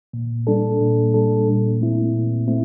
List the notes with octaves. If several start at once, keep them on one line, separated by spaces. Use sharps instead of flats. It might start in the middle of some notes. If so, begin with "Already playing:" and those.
A#2
G3 D4 A4
A#2
G3 D4 A4
A#2
A3 C4 E4
A#2
A3 C4 E4